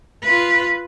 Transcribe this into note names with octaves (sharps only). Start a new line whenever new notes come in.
F4 B4